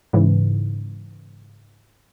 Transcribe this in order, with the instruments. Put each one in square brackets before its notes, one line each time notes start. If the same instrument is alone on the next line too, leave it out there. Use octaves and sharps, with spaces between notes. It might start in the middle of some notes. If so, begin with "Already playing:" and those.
[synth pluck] G#2 C#3 E3